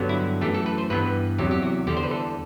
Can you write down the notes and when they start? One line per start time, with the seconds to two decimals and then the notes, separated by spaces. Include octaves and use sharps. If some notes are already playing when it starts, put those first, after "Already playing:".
Already playing: G2 D3 F#3 B3
0.09 E4
0.41 F#2 E3 A3 G4
0.54 A4
0.66 B4
0.78 C5
0.90 G2 E3 B3 B4
1.39 E2 C3 F#3 G4
1.51 G4
1.62 F#4
1.87 E2 D3 G3 G4
1.97 C5
2.03 B4
2.11 A4